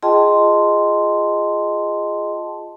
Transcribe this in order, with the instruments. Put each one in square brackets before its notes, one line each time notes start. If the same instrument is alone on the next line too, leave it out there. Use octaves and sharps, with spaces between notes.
[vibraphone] F4 G#4 D#5 G5 A5 C6